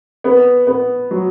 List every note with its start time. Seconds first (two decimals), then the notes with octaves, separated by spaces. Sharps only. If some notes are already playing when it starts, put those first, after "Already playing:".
0.24 B3
0.67 B3
1.11 F#3